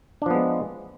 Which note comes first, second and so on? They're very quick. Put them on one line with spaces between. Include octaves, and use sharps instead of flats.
D4 F3 B3 G#3